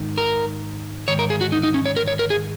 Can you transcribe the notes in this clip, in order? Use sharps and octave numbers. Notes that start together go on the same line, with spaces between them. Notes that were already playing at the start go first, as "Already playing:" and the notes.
Already playing: G#2 D#3
A#4
G#2 D#3 C#5
A#4
G#4
F#4
D#4
D#4
C#4
C#5
A#4
C#5
A#4
G#4